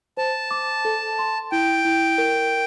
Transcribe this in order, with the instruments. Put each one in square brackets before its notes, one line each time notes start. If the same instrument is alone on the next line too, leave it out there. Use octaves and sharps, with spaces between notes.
[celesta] C5 [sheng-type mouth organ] A5
[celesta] D6
A4
C6
[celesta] E4 [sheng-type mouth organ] G5
[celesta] E4
A#4